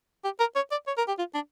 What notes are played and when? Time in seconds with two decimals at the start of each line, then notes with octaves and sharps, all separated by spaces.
0.24 G4
0.40 A#4
0.56 C#5
0.71 D5
0.87 C#5
0.97 A#4
1.08 G4
1.18 F4
1.34 D4